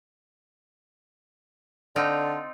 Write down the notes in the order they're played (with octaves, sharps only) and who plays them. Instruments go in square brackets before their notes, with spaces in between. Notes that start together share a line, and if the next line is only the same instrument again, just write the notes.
[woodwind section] D3 [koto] C4 D#4 F4